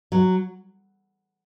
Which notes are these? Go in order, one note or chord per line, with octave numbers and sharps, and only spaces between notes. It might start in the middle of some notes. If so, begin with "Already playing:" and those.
F#3